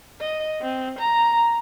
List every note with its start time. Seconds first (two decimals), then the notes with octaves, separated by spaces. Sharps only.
0.21 D#5
0.61 C4
0.99 A#5